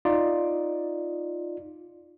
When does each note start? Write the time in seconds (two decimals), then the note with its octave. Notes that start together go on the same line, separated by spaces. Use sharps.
0.05 D#4 F4 D5